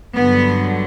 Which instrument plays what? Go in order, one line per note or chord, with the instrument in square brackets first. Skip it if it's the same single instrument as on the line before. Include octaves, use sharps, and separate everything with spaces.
[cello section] G2 D3 F#3 B3